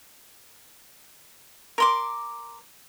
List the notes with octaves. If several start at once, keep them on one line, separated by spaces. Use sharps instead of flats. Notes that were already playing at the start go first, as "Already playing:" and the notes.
A#4 C6 D6